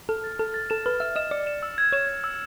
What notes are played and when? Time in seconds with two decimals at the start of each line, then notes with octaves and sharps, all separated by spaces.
0.09 A4 F6
0.24 A6
0.39 A4 F6
0.54 A6
0.70 A4 E7
0.86 B4 F6
1.00 E5 E7
1.16 D#5 E7
1.31 D5 C#7
1.47 E7
1.63 E6
1.78 G#6
1.92 C#5 E7
2.09 G#6
2.24 E6